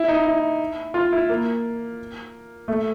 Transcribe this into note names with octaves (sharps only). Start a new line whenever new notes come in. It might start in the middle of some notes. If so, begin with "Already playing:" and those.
Already playing: E4
D#4
E4
F4
E4
A#3
A3